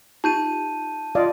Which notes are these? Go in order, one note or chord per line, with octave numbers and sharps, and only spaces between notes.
D#4 F4 G4 A5 G6 D#7
F4 D5 D#5 F5